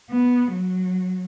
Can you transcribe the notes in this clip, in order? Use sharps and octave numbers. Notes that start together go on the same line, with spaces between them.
B3
F#3